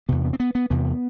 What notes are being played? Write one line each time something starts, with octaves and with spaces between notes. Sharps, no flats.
E2 C3 B3
B3
C4
B3
B3
E2 C3 B3